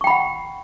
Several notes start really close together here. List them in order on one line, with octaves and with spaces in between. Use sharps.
C#6 G5 B5 F#5